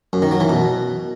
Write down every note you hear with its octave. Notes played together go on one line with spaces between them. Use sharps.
F#2
D#3
F#3
E3
B2